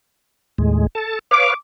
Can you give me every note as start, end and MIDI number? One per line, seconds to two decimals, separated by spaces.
0.58 0.87 39
0.58 0.87 45
0.58 0.87 56
0.95 1.19 69
0.95 1.19 81
1.31 1.54 71
1.31 1.54 73
1.31 1.54 77
1.31 1.53 86